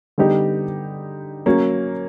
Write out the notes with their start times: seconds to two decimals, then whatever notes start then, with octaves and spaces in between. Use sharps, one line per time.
0.18 D3 G3 B3 D#4 G4
1.46 F#3 A#3 C#4